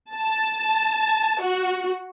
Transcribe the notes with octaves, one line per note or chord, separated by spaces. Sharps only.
A5
F#4